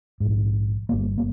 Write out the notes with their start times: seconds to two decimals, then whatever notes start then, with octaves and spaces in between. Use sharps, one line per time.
0.20 A#1 G#2
0.89 G1 G2 A#3
1.18 A#3